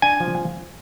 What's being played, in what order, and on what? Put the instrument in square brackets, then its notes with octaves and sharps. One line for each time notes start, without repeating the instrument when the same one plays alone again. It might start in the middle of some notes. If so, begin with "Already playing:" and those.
[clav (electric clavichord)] D4 G#5
F3